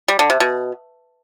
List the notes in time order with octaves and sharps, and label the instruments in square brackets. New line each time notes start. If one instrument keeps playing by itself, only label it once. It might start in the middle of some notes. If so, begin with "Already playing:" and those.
[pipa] G3
D3
C3
B2